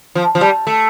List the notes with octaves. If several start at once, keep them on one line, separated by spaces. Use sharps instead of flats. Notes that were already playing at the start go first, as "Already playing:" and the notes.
F3
F3
G3
A3